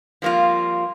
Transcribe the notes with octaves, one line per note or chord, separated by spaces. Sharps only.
F3 G3 A#3 C4 F4